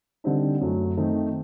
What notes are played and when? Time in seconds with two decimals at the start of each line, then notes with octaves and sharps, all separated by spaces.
0.24 D3 G3 C4 D#4
0.61 F#2 F#3 A3
0.97 D#3 A3 C4 D#4